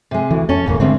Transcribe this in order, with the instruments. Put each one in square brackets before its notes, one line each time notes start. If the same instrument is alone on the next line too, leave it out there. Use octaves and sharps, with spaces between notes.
[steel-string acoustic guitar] C3 G#3
[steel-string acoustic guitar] D2 [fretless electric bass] E3
[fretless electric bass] F2 [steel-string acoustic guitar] C#4 A4
[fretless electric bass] D#1 E2 [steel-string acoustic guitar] G#2 C#3 A#3
[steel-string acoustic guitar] D#2 A2 C4 [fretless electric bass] D3 G#3